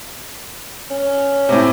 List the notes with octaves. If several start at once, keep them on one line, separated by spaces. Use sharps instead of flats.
C#4
A2 C3